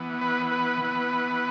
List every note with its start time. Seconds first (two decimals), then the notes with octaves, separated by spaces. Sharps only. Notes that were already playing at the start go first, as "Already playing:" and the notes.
Already playing: E3 B3
0.21 B4
0.52 B4
0.81 E3 B3